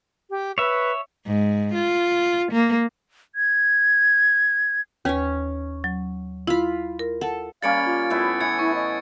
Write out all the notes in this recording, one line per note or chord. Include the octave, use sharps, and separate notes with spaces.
G4
B4 C#5 E5
G#2
F4
A#3
G#6
D#2 C#4 B4 C#5
F#3
E4 F4 B5
A#4
A4 F#5 A5
G3 A#3 C#4 F5 A6 C#7 D7
F4
A2 B3 E4
E3 G#6 C#7
E4 C#6
D#5